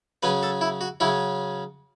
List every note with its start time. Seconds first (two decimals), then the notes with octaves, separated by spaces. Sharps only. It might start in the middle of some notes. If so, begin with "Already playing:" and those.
0.23 C#3 F#3 C#4 B4
0.43 A4
0.61 E4
0.81 F#4
1.00 C#3 F#3 C#4 E4